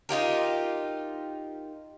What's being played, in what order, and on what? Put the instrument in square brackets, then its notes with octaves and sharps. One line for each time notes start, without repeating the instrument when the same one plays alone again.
[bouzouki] D#4 F4 G4 A#4